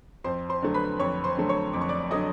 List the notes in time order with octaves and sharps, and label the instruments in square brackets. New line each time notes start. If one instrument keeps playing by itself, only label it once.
[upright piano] F2 C5 C6
C5 C6
D3 F#3 A3
B4 B5
F2 C#5 C#6
C5 C6
D3 F#3 A3
C#5 C#6
F2 D6
C#6
D5 D6
D3 F#3 A3 D#5 D#6